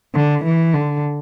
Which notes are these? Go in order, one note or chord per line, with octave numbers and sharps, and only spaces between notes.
D3
E3
D3